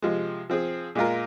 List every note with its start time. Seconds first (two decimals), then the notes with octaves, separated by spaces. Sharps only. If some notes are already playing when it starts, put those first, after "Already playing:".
0.02 C3 F3 G#3
0.50 F3 C4 G#4
0.95 A#2 G#3 F4 A#4